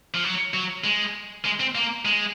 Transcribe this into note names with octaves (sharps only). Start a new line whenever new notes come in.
F3
F#3
F#3
G#3
G#3
C4
A#3
G#3